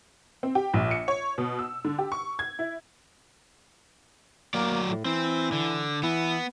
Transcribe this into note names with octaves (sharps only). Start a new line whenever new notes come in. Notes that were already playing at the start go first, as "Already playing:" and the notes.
C4
G4
A#1
C#7
C#5
B2
E6
D3
G4
C#6
G#6
E4
F#3 A#3 D5
A2
E3 C4
D3
E3 B3